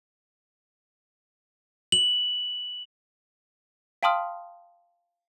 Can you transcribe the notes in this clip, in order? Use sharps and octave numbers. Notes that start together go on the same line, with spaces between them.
F#7
F5 G5 A5 C6 D#6 F6